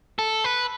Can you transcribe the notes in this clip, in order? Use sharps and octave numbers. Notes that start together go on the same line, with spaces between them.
A4
B4